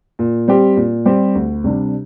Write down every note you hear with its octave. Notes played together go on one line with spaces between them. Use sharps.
A#2
G3 C4 G4
A#2
G3 C4 G4
D2
C3 G3 D4